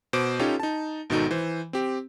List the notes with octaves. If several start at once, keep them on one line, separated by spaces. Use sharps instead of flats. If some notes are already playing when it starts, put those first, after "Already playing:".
B2 C5 D6 D7
C#4 D#4 F4 G4 A4 C#5
D#4 A5
G#1 B2 D#3 D#4 F#4 A4
E3 C5
C4 G4